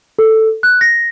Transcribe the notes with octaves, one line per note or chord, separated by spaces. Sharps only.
A4
F#6
A#6